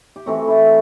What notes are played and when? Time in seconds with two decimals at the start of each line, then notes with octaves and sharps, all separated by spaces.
0.16 G4
0.26 E3 A3 C4 F#4
0.48 E4